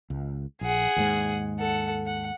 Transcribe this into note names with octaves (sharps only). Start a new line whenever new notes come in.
C#2
A#1 G#4 F#5
D#2 G#2 G#3
A4 F#5
F#5